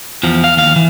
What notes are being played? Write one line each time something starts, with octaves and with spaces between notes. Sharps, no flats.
E2 F3
F5
D#2 F5
E3